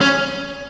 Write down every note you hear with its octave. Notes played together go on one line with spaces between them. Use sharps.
C#4